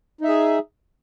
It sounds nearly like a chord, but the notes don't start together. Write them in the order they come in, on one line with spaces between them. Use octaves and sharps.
D#4 E5 G#4